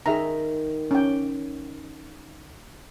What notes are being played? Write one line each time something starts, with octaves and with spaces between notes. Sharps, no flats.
D#3 G#4 E5 A#5
C#4 G5